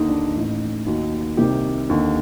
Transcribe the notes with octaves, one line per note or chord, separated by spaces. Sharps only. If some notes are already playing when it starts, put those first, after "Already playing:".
Already playing: D#2 D3 D#4
D4
A1 A2 D#4
D#2 D#3 F#4
C2 C3 D#3 G4
D#2 D3